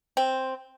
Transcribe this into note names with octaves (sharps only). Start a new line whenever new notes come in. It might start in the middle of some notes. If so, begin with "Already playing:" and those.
C4